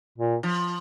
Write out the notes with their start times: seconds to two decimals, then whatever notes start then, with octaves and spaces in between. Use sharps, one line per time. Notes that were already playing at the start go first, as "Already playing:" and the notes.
0.18 A#2
0.43 F3